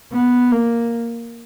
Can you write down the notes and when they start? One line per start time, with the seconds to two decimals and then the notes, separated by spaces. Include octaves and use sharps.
0.13 B3
0.52 A#3